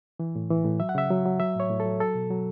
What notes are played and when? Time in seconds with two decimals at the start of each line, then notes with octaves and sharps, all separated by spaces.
0.20 E3
0.35 A2
0.51 E3
0.64 A2
0.80 F#3 E5
0.89 F#5
0.95 C#3 E5
1.10 F#3
1.26 F#3
1.40 F#3 E5
1.55 A2 C#5
1.70 A2
1.80 A4
1.85 F#3
2.00 F#3 A4
2.15 B2
2.30 F#3